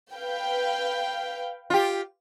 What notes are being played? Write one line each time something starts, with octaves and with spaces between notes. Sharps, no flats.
B4 F5 G5
F4 G4